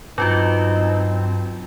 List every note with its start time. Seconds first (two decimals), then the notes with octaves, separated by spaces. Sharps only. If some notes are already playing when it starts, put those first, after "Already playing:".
0.18 G2 F#3 C4 D#4 F4 F#4